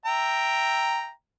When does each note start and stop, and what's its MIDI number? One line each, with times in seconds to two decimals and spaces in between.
0.06 1.10 76
0.06 1.10 79
0.06 1.10 82